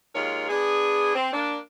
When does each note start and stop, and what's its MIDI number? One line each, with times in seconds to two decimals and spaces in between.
0.15 0.47 39
0.15 0.47 56
0.15 0.47 65
0.15 0.47 70
0.15 0.47 73
0.49 1.13 59
0.49 1.13 62
0.49 1.13 68
1.15 1.30 60
1.32 1.57 58
1.32 1.57 62